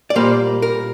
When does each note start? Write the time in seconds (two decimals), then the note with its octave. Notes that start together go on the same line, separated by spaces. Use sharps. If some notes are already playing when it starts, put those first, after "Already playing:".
0.10 D5
0.15 A#2 G3 A#3 C5
0.62 A#4